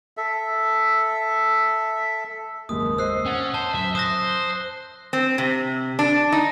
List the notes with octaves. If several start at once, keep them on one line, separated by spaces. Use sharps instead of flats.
A4 E5
F#1 D#2 G#2 D#6
C5 D#5 E6 F#6 C7
C#4 F#5 A6 F7
C5 A5
F#2 E5
C5 D#6 F#6 A#6
C4
C3
D4
D#4